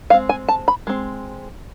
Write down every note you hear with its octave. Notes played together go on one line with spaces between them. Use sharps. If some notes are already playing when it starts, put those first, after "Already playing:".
G#3 C4 F5
G#5
A5
B5
G#3 C4